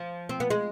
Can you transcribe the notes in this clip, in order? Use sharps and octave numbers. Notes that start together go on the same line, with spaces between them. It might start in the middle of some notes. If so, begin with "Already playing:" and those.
Already playing: F3
C4
B3
G#3